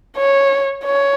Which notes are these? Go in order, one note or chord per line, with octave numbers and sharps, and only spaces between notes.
C#5
C#5